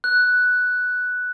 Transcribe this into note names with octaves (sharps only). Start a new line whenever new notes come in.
F#6